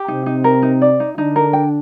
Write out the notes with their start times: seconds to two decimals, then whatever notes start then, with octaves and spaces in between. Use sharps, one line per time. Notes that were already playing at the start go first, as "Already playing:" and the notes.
Already playing: G4
0.08 C3 C4 D#4
0.26 D#4
0.44 A#4
0.62 D#4
0.82 D5
1.00 D#4
1.18 D3 D4 D#4
1.36 A#4
1.53 G5